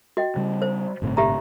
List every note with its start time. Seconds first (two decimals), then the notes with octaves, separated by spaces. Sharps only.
0.17 F#4 D#5 G5
0.36 C#3 G3
0.62 C5
1.02 G1 A2 C3
1.17 G4 E5 A#5